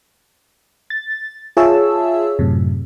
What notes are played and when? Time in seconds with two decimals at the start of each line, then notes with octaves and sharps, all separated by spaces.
0.90 A6
1.57 F4 G#4 C#5 E5 A5 E6
2.39 F#2 A2 C3